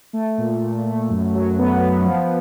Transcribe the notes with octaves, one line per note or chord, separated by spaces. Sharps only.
A3
A#2
A#2
A3
F#2
F#3
B3
B3
F3